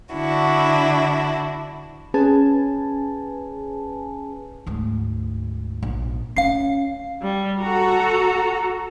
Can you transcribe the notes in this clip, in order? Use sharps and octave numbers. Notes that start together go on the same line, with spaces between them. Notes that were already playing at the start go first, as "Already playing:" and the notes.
D3 D4 E4 F#4
C#4 G#4 B4 G#5 A5
D2 G#2
A#1
C#4 F5 C7
G3
F#4 A4 A#5